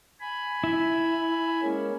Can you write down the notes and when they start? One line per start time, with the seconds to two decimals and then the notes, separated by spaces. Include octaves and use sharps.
0.20 G#5 B5
0.64 E4
1.63 G#3 A#3 C#4